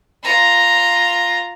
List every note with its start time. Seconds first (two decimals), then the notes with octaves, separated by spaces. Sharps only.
0.23 F4 A#5